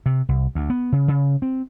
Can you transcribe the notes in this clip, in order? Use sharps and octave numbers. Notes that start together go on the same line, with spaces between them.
C3
C2
D2
B3
C#3
C#3
C4